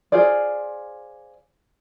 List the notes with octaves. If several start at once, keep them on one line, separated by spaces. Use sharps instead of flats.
F4 G#4 C5 D5